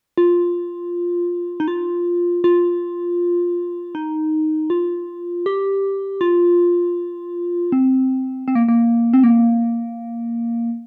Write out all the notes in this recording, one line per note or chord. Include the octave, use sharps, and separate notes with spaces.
F4
D#4
F4
F4
D#4
F4
G4
F4
C4
C4
A#3
A#3
C4
A#3